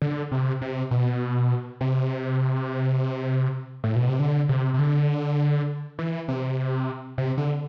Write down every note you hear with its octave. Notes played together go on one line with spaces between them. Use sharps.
D3
C3
C3
B2
C3
A2
B2
C3
D3
C3
C3
D3
E3
C3
C3
D3